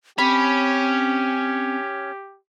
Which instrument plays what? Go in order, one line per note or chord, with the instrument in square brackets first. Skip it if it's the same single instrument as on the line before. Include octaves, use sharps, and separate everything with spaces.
[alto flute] C4 [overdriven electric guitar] C#4 [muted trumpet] G4 [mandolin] B5